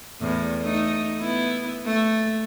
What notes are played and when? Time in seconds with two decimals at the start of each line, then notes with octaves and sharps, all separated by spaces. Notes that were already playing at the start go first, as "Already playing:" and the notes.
0.21 E2 A2
0.60 A3 D#4
1.20 B3 E4
1.86 A3